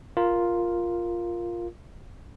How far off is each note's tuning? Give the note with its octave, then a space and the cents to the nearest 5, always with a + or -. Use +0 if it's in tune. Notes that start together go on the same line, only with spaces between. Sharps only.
F4 +0 A#4 +5